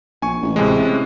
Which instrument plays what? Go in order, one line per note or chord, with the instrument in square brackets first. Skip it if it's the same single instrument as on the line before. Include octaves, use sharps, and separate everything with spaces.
[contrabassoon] A#1 [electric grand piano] G#5 C#6
[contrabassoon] A1
[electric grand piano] A2 C3 G#3